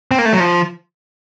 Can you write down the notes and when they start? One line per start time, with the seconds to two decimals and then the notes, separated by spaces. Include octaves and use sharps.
0.11 C4
0.18 A#3
0.25 A3
0.33 F#3
0.40 F3